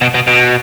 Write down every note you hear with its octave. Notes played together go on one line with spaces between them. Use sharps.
B2
B2
B2